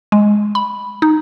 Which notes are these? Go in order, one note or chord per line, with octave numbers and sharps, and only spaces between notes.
G#3
B5
D#4